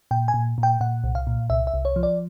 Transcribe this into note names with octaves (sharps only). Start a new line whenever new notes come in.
A#2 G5
G#5
A#2
A#2
G5
A#2 F#5
C2
F5
A#2
C2 E5
E5
C2
C#5
F3
D5